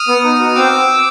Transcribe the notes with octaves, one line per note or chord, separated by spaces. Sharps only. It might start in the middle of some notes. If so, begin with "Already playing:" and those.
Already playing: D#6 F6
B3
D#4
F#4
C4 D6 E6